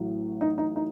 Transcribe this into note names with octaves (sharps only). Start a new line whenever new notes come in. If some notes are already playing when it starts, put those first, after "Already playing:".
Already playing: A1 A2 F#3
D#4
D#4
D#4